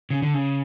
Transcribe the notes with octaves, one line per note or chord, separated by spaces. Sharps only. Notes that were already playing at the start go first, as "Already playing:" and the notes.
C#3
D3
C#3